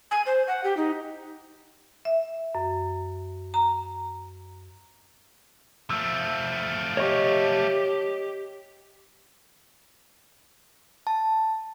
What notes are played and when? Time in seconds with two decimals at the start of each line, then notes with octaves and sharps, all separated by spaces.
0.11 G#5
0.26 C5
0.48 F#5
0.64 G4
0.77 D#4
2.05 E5
2.55 F#2
3.54 A#5
5.90 F3 A3 E6
6.97 G4 C#5 D#5 C#6
11.07 A5